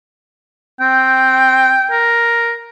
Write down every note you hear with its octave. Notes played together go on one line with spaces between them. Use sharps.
C4 G5
A#4